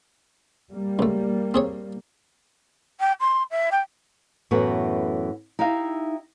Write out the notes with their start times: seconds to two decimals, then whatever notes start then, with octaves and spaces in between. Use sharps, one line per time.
0.70 G3 A#3
0.99 C#2 A3
1.54 C4 G#4 C#5
3.00 G5
3.20 C6
3.51 E5
3.71 G5
4.51 F#2 A2 E3 A3 B3 F#4
5.59 D#4 E4 G4 E5 F5